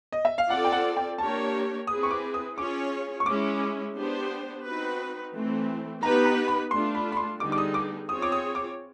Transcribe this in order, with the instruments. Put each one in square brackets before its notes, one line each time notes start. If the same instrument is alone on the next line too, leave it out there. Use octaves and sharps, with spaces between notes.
[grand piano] D#5
E5
F5
[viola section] C4 F4 A4 D5 [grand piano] F#5
[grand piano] G5
F#5
G5
[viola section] A#3 D4 G4 A#4 C#5 [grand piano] A5
[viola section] C4 E4 G#4 B4 [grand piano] D#6
[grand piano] C#6
D6
D#6
[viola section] C#4 F4 G#4 C#5 [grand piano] D6
[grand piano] C#6
[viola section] G#3 C#4 E4 [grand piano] D6
[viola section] B3 D4 G4 C5
C4 D#4 F#4 B4
E3 A3 C4
[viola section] B3 D#4 G4 B4 [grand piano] A#5
[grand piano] A#5
B5
[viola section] A3 D4 F4 [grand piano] C6
[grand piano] B5
B5
C6
[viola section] D3 G3 B3 D#4 G#4 [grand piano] D6
[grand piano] D6
D#6
D6
[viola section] C4 F4 G#4 C#5 [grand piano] D#6
[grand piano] D6
D#6
D6